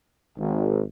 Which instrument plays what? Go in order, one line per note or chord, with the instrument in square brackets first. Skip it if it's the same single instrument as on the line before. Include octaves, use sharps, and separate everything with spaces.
[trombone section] G#1